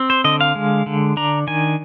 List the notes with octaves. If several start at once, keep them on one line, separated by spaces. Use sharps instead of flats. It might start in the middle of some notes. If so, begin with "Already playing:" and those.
Already playing: C4
C5
D3 D#5
F5
G#3
D3
D4 A#5
D#3 G#5